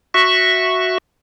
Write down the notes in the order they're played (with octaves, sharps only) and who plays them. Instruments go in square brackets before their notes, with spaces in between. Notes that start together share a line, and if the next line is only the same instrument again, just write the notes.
[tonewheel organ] F#4 E5 C#6